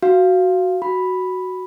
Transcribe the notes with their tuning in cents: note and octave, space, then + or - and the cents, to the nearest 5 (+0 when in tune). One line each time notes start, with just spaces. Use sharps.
F#4 +0 F5 -15
F#4 +0 B5 +0